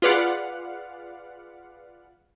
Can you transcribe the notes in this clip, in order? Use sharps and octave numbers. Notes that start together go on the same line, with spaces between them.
F4 G#4 B4 D5 F5 F#5